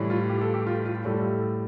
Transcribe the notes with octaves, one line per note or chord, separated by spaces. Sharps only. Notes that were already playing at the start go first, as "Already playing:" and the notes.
Already playing: A2 E3 G3
F4
G4
A4
G4
F4
F4
A2 G3 A4